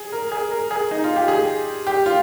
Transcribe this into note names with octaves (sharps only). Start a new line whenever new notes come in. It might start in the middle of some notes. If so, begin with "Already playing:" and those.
Already playing: G#4
A#4
G#4
A#4
G#4
D#4
F4
G4
G#4
G4
F4